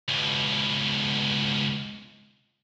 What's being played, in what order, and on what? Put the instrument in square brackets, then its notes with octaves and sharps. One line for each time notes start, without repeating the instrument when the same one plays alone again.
[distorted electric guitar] C#2 B2